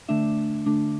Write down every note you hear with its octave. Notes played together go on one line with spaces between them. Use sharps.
D3 A3 D4 E5
D3 A3 D4